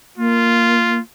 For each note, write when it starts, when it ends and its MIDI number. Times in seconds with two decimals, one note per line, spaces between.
0.18 1.00 58
0.18 1.00 65